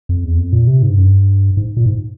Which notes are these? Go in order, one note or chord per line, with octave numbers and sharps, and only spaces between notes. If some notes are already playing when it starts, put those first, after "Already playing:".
F2
E2
F2
A#2
C3
G#2
G2
F#2
G2
G#2
A#2
G#2